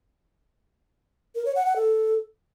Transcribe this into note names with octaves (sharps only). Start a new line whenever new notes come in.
A#4
C#5
F#5
F#5
A4